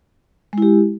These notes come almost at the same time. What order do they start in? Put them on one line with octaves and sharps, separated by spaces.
G#3 E4 G4